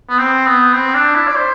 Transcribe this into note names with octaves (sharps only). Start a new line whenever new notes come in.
B3
C4
B3
C4
D4
E4
D5
C5